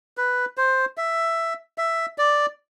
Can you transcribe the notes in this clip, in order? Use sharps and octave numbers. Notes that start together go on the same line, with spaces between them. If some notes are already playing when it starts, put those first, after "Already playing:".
B4
C5
E5
E5
D5